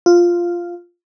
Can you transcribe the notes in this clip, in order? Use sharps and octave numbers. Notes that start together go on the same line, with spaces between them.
F4